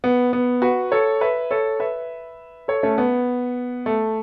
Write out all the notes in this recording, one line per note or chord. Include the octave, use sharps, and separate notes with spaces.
B3
B3
F#4 B4
A4 C#5
B4 E5
A4 C#5
B4 E5
A4 C#5
A3 C#4
B3
A3